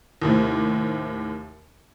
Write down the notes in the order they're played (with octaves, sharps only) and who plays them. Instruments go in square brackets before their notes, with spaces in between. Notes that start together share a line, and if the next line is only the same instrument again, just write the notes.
[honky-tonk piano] D#2 A2 C3